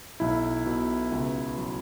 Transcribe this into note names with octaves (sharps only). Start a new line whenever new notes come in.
B1 E4
B2
C#2
F#3